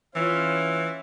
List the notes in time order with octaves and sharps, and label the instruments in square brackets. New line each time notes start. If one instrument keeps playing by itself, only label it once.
[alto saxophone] E3 [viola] C#4 F4